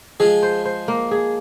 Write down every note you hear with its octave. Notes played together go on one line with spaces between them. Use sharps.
F3 G#3 G#4
C5
C5
A#3
G#4